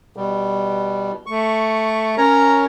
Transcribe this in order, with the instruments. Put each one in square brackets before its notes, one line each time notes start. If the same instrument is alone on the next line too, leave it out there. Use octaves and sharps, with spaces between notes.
[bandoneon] B2 G3
[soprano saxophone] A3 [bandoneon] C#6
[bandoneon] C#4 A#4 C#5 [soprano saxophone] A#5